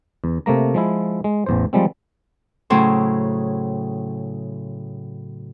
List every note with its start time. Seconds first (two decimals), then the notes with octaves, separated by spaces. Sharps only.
0.24 E2
0.46 C3 A3 A#3 A#5
0.74 F3 G#3 E4
1.24 G#3
1.46 A1 E2 C5
1.73 F3 G3 G#3 C4
2.70 A2 C#3 F#3 E4 C5